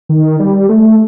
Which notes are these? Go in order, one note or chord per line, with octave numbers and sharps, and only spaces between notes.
D#3
G3
A3